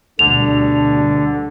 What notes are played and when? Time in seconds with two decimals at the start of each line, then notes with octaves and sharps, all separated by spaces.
0.19 D2 B2 D3 G3 D4 F7